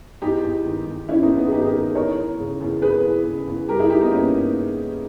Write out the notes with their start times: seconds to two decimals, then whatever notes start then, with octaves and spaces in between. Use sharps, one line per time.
0.22 E2 D#4 G4
0.43 E2
0.66 D#3
0.87 D#3
1.09 E2 C#4 E4
1.23 B3 D#4
1.31 E2
1.37 B3 D#4
1.47 G#4
1.52 D#3 D#4 G4
1.62 G#4
1.66 G4 A#4
1.73 D#3
1.95 E2 A#4 C#5
2.17 E3
2.39 C#3
2.60 E2
2.82 E2 G#4 B4
3.03 E3
3.25 C#3
3.47 E2
3.68 G2 G4 A#4
3.79 E4 G#4
3.90 G2 D#4 G4
4.01 B3 D#4
4.11 E3 A#3 C#4
4.34 E3